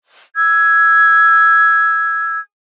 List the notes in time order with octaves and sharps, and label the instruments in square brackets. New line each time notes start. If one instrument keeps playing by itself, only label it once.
[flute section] E6 G#6